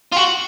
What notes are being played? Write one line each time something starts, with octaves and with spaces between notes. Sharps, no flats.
F4
F#4